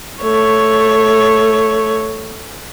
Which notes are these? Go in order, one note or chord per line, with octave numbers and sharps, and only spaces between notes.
A3 C#5